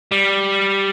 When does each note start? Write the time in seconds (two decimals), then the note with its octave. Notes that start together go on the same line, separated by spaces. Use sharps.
0.12 G3